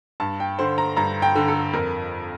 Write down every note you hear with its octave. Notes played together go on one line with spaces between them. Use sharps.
G2 A5
G5
D3 C5
A#5
G2 A#5
G5
D3
A4
F2 A#4